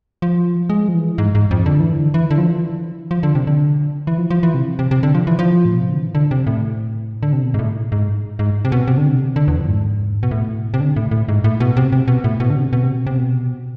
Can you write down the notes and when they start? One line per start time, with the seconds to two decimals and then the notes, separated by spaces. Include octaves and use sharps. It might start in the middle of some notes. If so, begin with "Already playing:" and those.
0.22 F3
0.70 G#3
0.89 F3
0.94 E3
1.18 G#2
1.35 G#2
1.51 F2
1.66 D3
1.80 E3
1.93 D3
2.14 E3
2.31 D3
2.38 F3
2.47 E3
3.11 F3
3.23 D3
3.35 C3
3.47 D3
4.07 E3
4.18 F3
4.31 F3
4.43 E3
4.54 C3
4.79 C3
4.91 C3
5.03 D3
5.15 F3
5.27 E3
5.39 F3
5.65 A2
5.74 B2
5.82 C3
5.91 D3
5.99 E3
6.15 D3
6.31 C3
6.47 A2
7.23 D3
7.33 C3
7.43 B2
7.54 G#2
7.59 A2
7.92 G#2
8.39 G#2
8.65 C3
8.72 B2
8.88 C3
8.98 D3
9.08 C3
9.36 D3
9.48 E2
9.58 F2
9.68 G#2
10.23 B2
10.31 A2
10.74 C3
10.80 D3
10.96 A2
11.11 A2
11.28 G#2
11.44 A2
11.60 B2
11.77 C3
11.92 C3
12.08 B2
12.24 A2
12.40 B2
12.50 D3
12.56 C3
12.73 B2
12.83 C3
12.94 B2
13.07 C3
13.18 B2